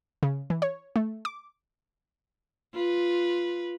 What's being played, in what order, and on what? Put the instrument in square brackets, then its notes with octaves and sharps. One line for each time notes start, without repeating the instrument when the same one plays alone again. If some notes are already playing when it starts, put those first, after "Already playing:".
[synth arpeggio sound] C#3
E3
C#5
A3
D6
[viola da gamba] F4 B4